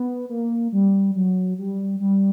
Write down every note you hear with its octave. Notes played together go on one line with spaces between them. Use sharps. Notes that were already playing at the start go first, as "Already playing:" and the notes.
Already playing: B3
A#3
G3
F#3
G3
G3